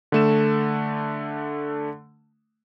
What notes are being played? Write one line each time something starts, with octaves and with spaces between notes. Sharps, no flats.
D3 A3 E7